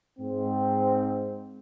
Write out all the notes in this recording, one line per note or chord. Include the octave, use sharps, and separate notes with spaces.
G#2 C4